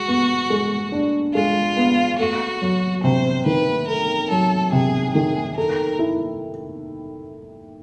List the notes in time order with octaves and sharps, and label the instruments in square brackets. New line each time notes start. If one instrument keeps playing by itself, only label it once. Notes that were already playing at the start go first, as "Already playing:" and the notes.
Already playing: [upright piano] G#3 [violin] F#4
[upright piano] B3
G#3
D4
[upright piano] G#3 [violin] F4
[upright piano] B3
[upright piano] A3 [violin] F#4
[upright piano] F#3
[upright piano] C3 [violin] C5
[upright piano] D#3 [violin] B4
[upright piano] A3 [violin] A#4
[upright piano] F#3 [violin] A4
[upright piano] C3 [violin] G#4
[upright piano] D#3 [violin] G#4
[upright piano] A4 [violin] A#4
[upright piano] E4